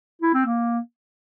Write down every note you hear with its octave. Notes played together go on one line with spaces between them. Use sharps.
E4
C4
A#3